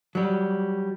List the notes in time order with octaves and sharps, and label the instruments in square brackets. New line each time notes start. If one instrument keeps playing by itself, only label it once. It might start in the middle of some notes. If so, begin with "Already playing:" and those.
[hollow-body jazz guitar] F#3 G3